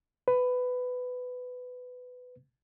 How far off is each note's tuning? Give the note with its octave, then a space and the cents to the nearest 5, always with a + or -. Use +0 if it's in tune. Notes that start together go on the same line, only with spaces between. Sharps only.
B4 +15